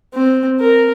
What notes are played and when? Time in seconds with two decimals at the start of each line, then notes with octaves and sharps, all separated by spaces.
0.14 C4
0.60 A#4